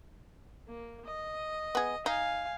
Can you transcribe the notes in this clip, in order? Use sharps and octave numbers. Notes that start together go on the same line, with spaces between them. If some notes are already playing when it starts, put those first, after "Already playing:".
A#3
D#5
B3 G#4
D#4 F5 G#5